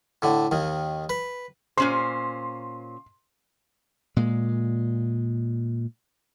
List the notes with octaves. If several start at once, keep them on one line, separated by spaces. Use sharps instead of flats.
A2 D3
D#2 D#3
B4
A#2 C#4 C5 C6
A#2 G#3